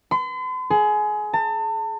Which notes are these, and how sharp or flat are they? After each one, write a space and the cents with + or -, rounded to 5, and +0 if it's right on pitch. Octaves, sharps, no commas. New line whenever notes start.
C6 -45
G#4 +25
A5 +35